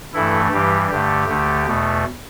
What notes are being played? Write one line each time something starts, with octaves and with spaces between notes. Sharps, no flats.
G2 E3 A3 E4 A4
G2 E3 G3 G4
G2 D3 A3 G4
D2 D3 A3
E2 B2 A3